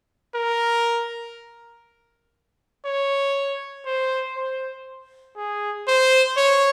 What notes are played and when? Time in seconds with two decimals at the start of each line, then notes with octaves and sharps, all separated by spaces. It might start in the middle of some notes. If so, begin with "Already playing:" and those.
0.35 A#4
2.85 C#5
3.86 C5
4.36 C5
5.36 G#4
5.88 C5
6.37 C#5